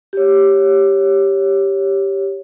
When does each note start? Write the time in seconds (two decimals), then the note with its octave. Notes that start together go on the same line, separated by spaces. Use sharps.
0.13 G4 C#5